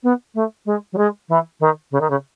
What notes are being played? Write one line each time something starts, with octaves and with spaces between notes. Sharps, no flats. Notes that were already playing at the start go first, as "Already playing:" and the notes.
B3
A3
G#3
F#3
G#3
E3
D#3
C#3
D#3
C#3